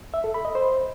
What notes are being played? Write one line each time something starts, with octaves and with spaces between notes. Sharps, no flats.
E5
A4
B5
D#5
C5